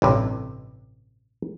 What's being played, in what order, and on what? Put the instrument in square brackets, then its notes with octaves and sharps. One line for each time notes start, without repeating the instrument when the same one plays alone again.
[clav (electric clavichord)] A1 G2 C3